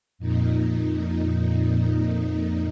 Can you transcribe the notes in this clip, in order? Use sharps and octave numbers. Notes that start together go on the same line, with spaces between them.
F2 A#2 D#4